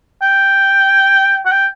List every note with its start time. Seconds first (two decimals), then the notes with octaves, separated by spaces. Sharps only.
0.22 G5
1.46 F#5
1.51 G5